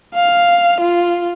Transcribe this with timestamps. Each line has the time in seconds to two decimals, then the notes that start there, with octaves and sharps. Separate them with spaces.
0.14 F5
0.80 F4